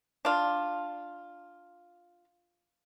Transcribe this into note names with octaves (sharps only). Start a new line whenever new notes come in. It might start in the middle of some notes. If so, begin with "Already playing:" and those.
D4 F4